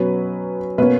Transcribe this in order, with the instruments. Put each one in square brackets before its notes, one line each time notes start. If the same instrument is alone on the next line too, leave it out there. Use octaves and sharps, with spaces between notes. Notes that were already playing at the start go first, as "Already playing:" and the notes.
Already playing: [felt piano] B2 F#3 C#4 B4
B2 A#3 C#4 B4